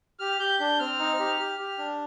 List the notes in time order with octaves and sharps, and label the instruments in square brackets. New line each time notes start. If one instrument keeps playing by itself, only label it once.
[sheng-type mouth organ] G4 F6
G4 G6
D4 G6
C4 F6
D#4
G4
G4
G4
D4